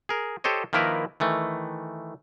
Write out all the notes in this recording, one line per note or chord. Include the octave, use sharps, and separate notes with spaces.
G#4 A#4
G4 A4 C5 C#5 D#5
D#3 F3 A#3 E4 A#4 B4
D#3 E3 A3